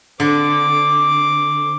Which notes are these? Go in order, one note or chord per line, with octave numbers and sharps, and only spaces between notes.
D3 C4 D6